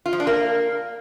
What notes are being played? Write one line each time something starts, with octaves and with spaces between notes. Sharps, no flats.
F4
F3
D4
A#3